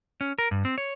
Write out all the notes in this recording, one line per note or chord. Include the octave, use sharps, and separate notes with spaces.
C#4
A#4
G2
C4
C#5